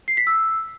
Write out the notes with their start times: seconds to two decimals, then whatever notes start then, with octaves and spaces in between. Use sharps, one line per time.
0.08 C7
0.17 B6
0.27 E6